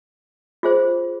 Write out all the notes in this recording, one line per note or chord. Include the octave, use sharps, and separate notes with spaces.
F4 G#4 C5